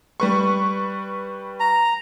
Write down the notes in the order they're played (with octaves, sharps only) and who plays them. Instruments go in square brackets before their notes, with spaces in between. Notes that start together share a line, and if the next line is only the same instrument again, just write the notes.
[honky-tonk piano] G3 B4 C#6
[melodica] A#5